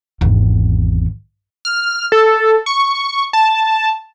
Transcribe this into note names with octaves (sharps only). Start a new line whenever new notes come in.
G#1 E2
F6
A4
C#6
A5